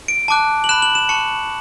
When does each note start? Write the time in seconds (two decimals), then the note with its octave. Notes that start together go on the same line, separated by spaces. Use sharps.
0.08 D7
0.28 A5 D6 F#6
0.64 F#7
0.69 B5 F#6 E7
0.82 F#7
0.95 E7
1.09 A5 C#6 F#6 C#7